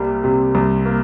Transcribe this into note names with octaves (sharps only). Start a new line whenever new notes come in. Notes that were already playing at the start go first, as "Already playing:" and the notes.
Already playing: C2 G3 A#3
C3
C2
A#3